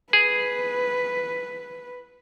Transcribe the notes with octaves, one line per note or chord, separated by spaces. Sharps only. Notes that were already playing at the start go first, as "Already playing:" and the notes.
G#4 B4